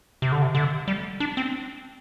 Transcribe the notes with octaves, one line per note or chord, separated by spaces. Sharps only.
C3
D3
C3
D3
G3
D4
C4